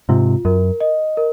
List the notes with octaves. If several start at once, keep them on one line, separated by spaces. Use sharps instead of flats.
G#2 C3 F4
F#2 A#4
D#5
A#4